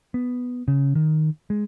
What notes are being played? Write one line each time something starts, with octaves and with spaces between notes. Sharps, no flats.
B3
C#3
D#3
G#3